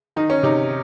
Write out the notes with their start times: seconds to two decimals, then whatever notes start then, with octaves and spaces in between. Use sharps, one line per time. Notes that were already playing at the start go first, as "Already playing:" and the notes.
0.16 D#3 D#4
0.30 C#4
0.43 C3 D#4